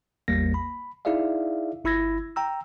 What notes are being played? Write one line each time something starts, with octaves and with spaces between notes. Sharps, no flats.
A1 E2 G3 A#3 A#6
B5
D#4 E4 G#4 D5 E5 F5
G1 E4 B5 E6 G#6 A#6
G5 A#5 E6